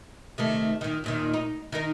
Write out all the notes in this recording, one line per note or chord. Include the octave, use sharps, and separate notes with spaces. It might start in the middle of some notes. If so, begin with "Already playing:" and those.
C3 D#3 A3
A#2 D#3
D#2 A#2 D#3
D#4
D#3 D#4 A#4